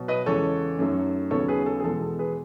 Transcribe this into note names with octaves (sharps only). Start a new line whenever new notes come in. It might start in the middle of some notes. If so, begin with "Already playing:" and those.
Already playing: B2 F#3 B3
B4 D#5
E2 C#3 G#3 A4 C#5
F#2 D#3 F#3 A3
D#2 C#3 F#3 B3 A4 C#5
G#4 B4
A4
G#4
E2 B2 G#3 B3 A4
A4
G#4 B4